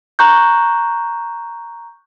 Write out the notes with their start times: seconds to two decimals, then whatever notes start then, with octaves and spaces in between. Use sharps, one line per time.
0.19 A#5 C#6 F#6 G6